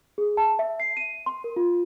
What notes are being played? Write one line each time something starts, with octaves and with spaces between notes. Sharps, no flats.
G#4
A5
E5
C7
D#7
C6
A#4
F4